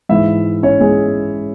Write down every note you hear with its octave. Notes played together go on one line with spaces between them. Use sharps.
G#2 E3 E4 E5
C#4 C#5
G#3 G#4